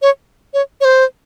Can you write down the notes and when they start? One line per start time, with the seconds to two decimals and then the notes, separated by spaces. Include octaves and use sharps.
0.02 C#5
0.54 C#5
0.81 C#5
0.85 C5